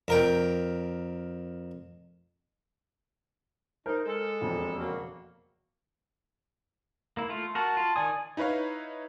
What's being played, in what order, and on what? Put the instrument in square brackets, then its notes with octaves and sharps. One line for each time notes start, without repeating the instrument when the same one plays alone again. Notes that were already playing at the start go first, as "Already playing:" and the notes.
[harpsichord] F2 A#4 G5
[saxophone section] D#4 [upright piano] A#4 C5
[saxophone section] G#3 A4
[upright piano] E1 F2
[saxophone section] C#3 F#3 A#3
[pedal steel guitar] A#3 E4
A3 F4
[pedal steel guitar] F#4 A#4 [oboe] A5
[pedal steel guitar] F4
[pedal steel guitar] D#3 D5 D#6 [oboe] G#5
[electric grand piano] D#4 E4 B4 C#5 F5